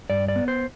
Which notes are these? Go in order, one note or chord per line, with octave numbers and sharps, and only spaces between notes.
G2 D5
D5
B3
C5